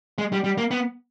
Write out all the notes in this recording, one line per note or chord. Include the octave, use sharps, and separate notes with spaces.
G#3
G3
G3
A#3
B3